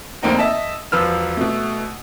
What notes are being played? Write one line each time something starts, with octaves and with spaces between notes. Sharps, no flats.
F1 D2 A#3 C4 D#4
D#5 E5 A5
E1 F3 F4 B4 E6 F6
B2 A3